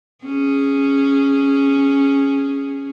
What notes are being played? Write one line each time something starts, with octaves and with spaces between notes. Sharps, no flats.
C#4 G#4